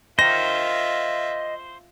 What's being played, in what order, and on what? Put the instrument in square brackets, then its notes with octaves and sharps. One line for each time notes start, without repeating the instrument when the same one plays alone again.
[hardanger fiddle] F4 E5 [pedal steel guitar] C5 [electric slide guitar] D#5 G5 [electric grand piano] A#6